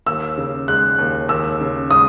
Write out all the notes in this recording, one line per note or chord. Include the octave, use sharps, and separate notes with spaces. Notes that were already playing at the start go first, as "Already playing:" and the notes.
D#2 E6
C#3
G#3 F#6
D#2
D#2 E6
C#3
G#3 D#6